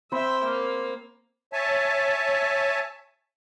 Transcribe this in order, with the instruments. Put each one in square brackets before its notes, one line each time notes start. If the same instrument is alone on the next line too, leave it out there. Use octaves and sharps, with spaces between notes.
[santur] C4 C5 B5 [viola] E5 G5
[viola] A#3
[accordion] C#5 E5 G#5 A5